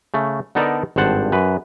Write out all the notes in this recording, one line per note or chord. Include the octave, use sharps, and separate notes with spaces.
C#3 A3
D3 B3 D#4 A4 A#4 D5
G#1 G2 C5 F#5 A5
F#2 B4